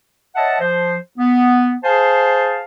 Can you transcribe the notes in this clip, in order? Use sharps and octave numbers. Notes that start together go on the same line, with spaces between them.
C#5 D#5 E5 F#5 A5
F3 C5
B3
G#4 C5 F5 G#5 A5